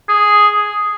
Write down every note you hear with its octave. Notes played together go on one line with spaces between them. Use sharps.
G#4